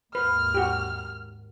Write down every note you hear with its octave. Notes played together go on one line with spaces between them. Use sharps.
D#2 G#2 B4 F6
F#4 G4